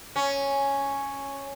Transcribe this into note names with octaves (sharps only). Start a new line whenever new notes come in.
C#4